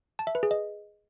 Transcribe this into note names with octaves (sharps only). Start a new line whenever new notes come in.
A5
E5
B4
G#4
D#5